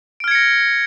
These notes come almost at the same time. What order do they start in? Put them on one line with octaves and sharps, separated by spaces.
D7 F6 G#6 C#7 A#6